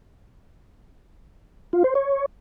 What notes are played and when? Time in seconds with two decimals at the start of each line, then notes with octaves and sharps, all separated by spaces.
1.73 F4
1.84 C5
1.95 C#5